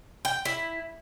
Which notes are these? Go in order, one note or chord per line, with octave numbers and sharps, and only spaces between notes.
G5
E4